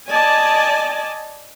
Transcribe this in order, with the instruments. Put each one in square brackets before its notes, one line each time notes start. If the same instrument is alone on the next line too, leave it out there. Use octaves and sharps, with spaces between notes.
[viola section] D5 D#5 G#5 A5